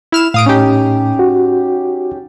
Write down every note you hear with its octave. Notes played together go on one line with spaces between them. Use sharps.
E4 F6 E7
A2 F5 D#6 D7
C#4 D#4 G4
F#4